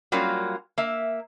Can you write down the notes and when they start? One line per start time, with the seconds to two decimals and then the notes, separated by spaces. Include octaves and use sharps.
0.12 F#3 G3 A#3 C#4 F4
0.78 A#3 E5